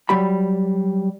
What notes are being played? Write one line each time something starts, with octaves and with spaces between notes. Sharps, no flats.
F#3 G3 B5